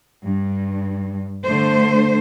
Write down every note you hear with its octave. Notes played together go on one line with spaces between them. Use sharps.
G2
D3 A3 C5